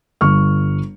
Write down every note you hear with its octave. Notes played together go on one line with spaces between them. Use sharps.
G1 C#6 F6